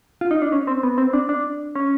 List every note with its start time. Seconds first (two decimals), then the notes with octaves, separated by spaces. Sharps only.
0.21 F4
0.31 D#4
0.42 D4
0.52 C#4
0.67 C4
0.83 B3
0.98 C4
1.13 D4
1.29 D4
1.75 C#4